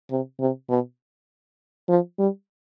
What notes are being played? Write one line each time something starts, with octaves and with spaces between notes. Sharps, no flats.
C3
C3
B2
F3
G3